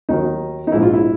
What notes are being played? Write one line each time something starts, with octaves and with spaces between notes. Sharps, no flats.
D#2 D#3 F#3 D#4
D#4
A#1 G#2 F3 E4
F4
E4